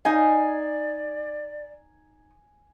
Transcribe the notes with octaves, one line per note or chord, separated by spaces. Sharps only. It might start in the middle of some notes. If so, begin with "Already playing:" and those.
D#4 D5 D#5 F5 G#5